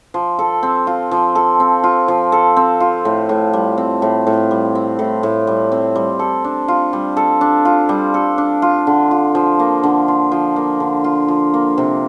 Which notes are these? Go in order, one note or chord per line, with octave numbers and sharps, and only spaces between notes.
F3
A4
C4
F4
F3
A4
C4
F4
F3
A4
C4
F4
A2
A2
G3
C4
A2
A2
G3
C4
A2
A2
G3
C4
G3
A4
D4
F4
G3
A4
D4
F4
G3
A4
D4
F4
D3
F4
F3
A#3
D3
F4
F3
A#3
D3
F4
F3
A#3
C3